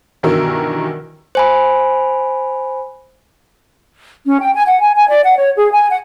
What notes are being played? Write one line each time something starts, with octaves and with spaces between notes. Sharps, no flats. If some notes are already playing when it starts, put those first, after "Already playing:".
G2 B2 D#3 E3 A#4 E6
C5 G#5 B5
C#4
G5
G#5
F#5
G#5
G#5
D5
F#5
C#5
G#4
G#5
F#5